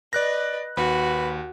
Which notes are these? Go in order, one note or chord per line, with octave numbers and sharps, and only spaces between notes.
B4 D5 D#5 F#6 A#6
D#2 F#4 B4